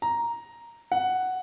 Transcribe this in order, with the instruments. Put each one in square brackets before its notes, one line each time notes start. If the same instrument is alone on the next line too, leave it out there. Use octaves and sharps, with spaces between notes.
[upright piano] A#5
F#5